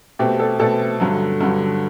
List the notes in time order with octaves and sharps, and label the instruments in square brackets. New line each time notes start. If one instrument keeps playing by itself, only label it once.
[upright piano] B2 A3 C4 [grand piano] G4
[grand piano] A4
[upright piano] B2 A3 C4 [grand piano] A4
[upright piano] G2 D3 F#3
[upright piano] G2 D3 F#3 [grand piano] F#4